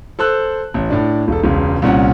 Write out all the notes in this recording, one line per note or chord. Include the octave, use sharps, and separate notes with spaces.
A4 C5 E6 F#6
A1
A2 D4
E1 A4
E1 C#2
C2 A#2 C#4 F#5